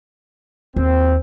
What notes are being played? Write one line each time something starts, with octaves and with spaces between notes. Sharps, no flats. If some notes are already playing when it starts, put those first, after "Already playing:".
D#2 C4